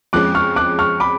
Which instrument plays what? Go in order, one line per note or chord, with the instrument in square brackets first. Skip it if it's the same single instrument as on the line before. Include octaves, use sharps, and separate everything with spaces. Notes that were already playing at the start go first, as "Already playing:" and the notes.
[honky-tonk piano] F2 F3 G#3 C#4 [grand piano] D6 F#6
[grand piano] C#6 F6
D6 F#6
C#6 F6
B5 D6